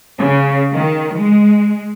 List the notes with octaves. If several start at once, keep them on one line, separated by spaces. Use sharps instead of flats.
C#3
D#3
G#3